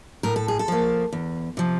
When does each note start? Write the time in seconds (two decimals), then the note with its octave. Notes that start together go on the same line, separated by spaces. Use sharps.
0.23 A2 A#4
0.36 A4
0.48 G#4
0.59 A4
0.68 F3 A#3
1.13 E2
1.57 C3 F3